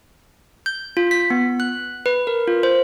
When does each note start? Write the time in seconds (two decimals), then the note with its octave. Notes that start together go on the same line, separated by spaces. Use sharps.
0.66 G6
0.97 F4
1.11 B6
1.30 B3
1.60 F#6
2.06 B4
2.27 A#4
2.48 F4
2.63 C5